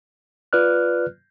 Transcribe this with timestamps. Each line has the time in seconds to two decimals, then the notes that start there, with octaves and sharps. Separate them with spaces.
0.53 F4 B4 D5 F6 F#6